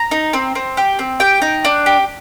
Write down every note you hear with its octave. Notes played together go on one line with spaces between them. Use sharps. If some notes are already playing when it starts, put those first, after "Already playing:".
Already playing: A#5
D#4
C4
C4
G4
C4
G4 G5
D#4
D4
G4